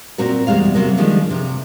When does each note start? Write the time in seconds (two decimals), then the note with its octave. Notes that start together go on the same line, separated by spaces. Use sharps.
0.18 A#2 C4 F#4 A#4
0.47 E2 B2 G3 G#3 F5
0.74 C3 F#3 A#3 C4
0.97 D3 D#3 F3 G3 G#3
1.30 C3